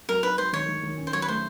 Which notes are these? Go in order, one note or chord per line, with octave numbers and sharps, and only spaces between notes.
F#3 A#4
D#4 B4
F#3 C5
D#3 C#5
D#3
D#3
C#4
C5
F#3 C#5
B4
A3 C5